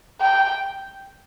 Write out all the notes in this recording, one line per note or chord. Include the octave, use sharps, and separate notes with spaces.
G5